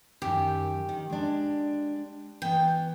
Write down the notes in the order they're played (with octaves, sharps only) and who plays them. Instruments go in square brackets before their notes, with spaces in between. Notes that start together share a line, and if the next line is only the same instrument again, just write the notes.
[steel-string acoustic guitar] F#2 D#3 [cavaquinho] G4
[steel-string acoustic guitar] D#3
G#3 D4
[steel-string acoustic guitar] E3 B3 [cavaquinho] G5